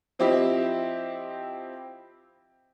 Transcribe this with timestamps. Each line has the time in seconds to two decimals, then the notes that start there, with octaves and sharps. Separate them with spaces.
0.19 F3 C4 E4 G4 D#5